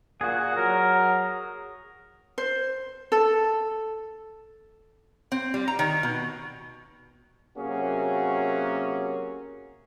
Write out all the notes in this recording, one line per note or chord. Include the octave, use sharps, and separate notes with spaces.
A#2 F#4 G#4 F#5
F#3 A#4
C5
A4
C4
G3
A#5
D#3
B2
C3 F#3 A#3 C#4 F#4 G#4